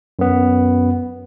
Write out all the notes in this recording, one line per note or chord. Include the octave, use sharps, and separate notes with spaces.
F#2 B3